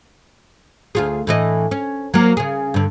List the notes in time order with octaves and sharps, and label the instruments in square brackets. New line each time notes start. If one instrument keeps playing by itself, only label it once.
[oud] D2 F4 G#4
A2 E3 D#5
C#4
F#3 A#3
C#3 G#4
G2 D3